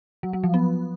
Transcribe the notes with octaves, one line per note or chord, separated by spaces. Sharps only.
F#3
F#3
F3
B3